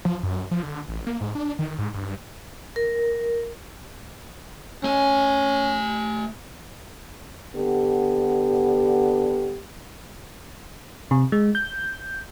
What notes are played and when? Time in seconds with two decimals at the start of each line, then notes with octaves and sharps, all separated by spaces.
0.05 F3
0.23 F#2
0.51 F3
0.63 D3
0.88 A1
1.07 A#3
1.21 G#2
1.35 D4
1.59 D#3
1.78 G#2
1.94 G2
2.76 A#4
4.84 A3 C#4 G#5
7.56 D3 B3 G4
11.11 C3
11.32 G#3
11.55 G6